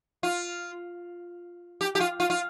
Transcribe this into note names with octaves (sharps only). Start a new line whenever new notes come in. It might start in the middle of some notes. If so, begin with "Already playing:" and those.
F4
G4
G4
F4
F4
F4